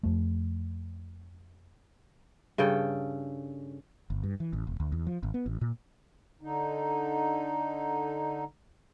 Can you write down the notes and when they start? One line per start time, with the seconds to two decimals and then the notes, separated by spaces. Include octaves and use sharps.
0.03 F2 A3
2.58 G2 C#3 A4 G5
4.10 G1
4.24 G2
4.40 E3
4.53 A1
4.67 E1
4.80 D2
4.92 E2
5.07 F3
5.23 G#1
5.34 B3
5.46 A1
5.61 A#2
6.41 D3 D#4